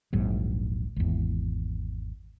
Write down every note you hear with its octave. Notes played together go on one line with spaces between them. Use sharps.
D#1 A#1 G#2 F#3
G#1 E2